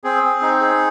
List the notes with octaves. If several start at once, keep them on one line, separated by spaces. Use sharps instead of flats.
C4 G#4
C4
D#4
G#4